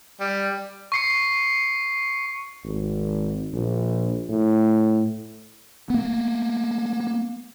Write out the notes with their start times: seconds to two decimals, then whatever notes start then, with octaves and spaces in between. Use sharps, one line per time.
0.20 G3
0.92 C#6 C7 C#7
2.64 G#1
3.53 A#1
4.29 A2
5.90 A#3 B3